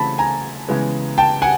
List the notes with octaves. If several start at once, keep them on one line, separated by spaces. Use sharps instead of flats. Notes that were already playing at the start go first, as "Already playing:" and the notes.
Already playing: C#3 E3 A3 C4 A5 B5
G#5 A#5
C#3 E3 G#3 B3
G5 A5
F#5 G#5